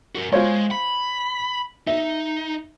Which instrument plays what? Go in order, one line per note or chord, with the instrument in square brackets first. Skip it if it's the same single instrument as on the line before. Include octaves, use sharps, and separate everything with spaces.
[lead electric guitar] F#4 A#4
[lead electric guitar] G#3 [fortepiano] F4 C5 C#5
[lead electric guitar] B5
[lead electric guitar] D#4 [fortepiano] E5